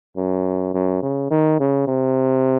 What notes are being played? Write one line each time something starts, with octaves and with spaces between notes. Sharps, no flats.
F#2
F#2
C#3
D#3
C#3
C3